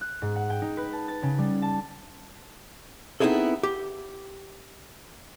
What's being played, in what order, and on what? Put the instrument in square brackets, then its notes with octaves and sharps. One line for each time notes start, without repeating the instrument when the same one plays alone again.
[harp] F#6
G#2
F#5
G5
D#4
B4
A5
A6
C#3
G3
A5
[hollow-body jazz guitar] B3 C4 D#4 E4 G#4 A4
G4